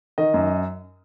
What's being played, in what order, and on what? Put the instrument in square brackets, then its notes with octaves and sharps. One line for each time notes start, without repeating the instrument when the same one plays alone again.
[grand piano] D#3 D#5
F#2